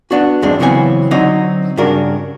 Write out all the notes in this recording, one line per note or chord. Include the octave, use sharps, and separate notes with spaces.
B3 D4 F#4
E2 G2 G#3 C4 D4
C#3 E3 F#3 B3 C4 G#5
D3 F#3 C4 D#4 F#4
G2 C#3 D4 F#4 A#4